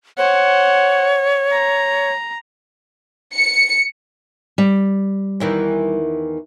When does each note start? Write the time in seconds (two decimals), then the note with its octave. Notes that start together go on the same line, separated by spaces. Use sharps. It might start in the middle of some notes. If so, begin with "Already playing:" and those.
0.18 C5 C#5 F#5
1.52 A#5
3.34 C#7
4.58 G3
5.40 E2 D#3 E3